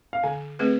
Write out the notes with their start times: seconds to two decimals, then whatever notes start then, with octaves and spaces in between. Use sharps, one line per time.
0.13 F5
0.23 D3 G#5
0.59 A3 C4 G#4 B4